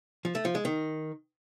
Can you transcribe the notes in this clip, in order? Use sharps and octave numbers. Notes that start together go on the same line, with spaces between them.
F3
A3
F3
G#3
D#3